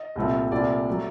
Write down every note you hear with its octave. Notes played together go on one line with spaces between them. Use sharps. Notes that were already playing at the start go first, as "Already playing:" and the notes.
Already playing: D#5
C2 A#2 A3 C4
C2 A#2 A3 C4 D5
F#3 A3